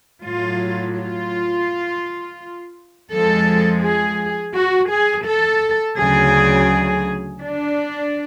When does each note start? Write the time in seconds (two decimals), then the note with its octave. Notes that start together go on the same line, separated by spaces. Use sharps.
0.24 A2 F#3 F4
0.97 F4
3.11 F2 F3 G#3 A4
3.83 G#4
4.55 F#4
4.90 G#4
5.26 A4
5.98 D2 C#3 F#3 G#4
7.41 D4